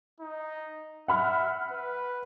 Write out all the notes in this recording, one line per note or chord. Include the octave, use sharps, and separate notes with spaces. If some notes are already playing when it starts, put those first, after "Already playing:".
D#4
E5 F#5 B5 F6
B4